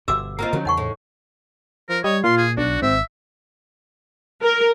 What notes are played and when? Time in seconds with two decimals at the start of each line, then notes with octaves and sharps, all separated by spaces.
0.08 G1 B2 F#4 E5 D6 E6
0.39 A#3 C4 F4 D#5 A#5
0.53 D3 D#3 F3 F#3 C#4
0.65 E2 C#3 D#4 F#5 C#6
0.77 A2
1.89 F3 A#4
2.04 G3 C#5 D#5
2.24 A#2 F4 C6
2.37 G#4
2.57 B1 D4 F#4
2.82 G#1 C4 E5
4.42 A#4